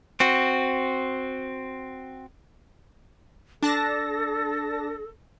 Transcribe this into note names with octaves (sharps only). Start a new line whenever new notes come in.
C4 F#4
D4 A4 A5 A#6